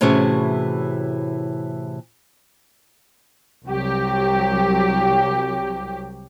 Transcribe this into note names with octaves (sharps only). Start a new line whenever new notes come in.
A2 C3 E3 C#4 F#4 G#4
C2 F#3 G4